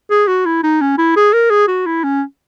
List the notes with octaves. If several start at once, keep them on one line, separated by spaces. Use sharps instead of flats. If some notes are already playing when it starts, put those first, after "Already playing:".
G#4
F#4
E4
D#4
C#4
E4
G#4
A#4
G#4
F#4
E4
C#4